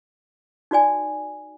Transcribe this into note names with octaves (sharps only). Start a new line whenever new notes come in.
D#4 F#4 D5 G#5